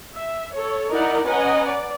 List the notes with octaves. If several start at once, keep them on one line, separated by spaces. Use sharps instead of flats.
E5
A4 C#5
D#4 E4 A#4 D5 F#5
C#4 B4 D#5 F#5 G#5 A#5
D5